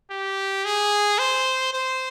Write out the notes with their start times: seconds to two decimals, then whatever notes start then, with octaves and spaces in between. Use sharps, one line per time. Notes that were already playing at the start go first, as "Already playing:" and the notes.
0.10 G4
0.65 G#4
1.19 C5
1.73 C5